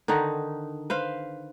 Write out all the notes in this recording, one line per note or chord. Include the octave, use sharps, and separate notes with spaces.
D3 D#3 D#4 F#5
B4 C5 F5